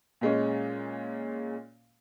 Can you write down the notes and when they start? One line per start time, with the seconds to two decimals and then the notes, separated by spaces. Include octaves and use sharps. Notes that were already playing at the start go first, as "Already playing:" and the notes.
0.21 A#2 G#3 C#4